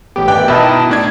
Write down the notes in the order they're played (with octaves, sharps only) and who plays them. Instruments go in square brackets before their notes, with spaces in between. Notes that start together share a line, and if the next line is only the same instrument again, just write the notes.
[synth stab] A1 G4 [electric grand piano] B3
[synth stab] G2 D#3 E3 [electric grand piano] G5 D6 F#6
[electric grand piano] B2 [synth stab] D#4 E4 A5
[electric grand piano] A2 D4 G#6